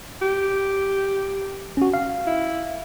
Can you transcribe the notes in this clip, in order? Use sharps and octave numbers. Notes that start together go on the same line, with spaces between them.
G4
C#4 F#4
F5
E4